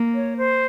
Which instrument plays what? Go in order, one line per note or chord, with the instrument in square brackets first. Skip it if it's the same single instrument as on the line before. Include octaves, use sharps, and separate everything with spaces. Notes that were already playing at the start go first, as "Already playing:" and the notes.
Already playing: [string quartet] A#3
[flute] C#5
C5